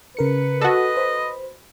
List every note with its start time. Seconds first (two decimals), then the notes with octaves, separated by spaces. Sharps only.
0.17 C#3 A#4 B4 C#7
0.61 F#4 A4 D#5
0.97 C5 B5